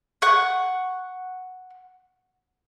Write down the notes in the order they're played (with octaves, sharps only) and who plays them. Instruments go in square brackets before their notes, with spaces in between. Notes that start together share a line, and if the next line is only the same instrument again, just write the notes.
[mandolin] F#5 C#6 F#6